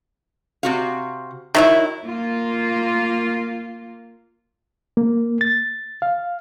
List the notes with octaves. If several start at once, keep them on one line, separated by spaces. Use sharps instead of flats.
C3 F#4 F5
D#3 F#3 D#4 E4 E5
A#3 F4
A#3
A6
F5